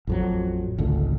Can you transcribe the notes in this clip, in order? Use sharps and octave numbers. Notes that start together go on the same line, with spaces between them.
A1 F2 F#3
G#1 C#2 D3 A3